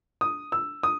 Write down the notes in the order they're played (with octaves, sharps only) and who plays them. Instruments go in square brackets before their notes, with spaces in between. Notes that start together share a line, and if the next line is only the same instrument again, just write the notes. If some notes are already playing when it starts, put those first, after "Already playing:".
[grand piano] D#6
E6
D#6